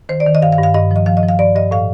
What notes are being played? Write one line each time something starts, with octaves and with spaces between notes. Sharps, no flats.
D#3 C5
D5
D#3
D#5
G2 F5
F5
G2
F5
G2 D#5
F3 D#5
F3 F5
D#5
F3
F5
G2 D5
G2 D#5
A2 F5